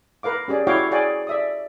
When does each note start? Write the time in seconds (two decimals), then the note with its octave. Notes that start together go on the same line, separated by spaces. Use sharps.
0.23 A#4 B4 F5 D6
0.48 C#4 G4 G#4 D5
0.67 E4 F#4 C#5 F5 G5 D6
0.91 G#4 C#5 D5 F5 G5 G#5
1.27 D5 E5 D#6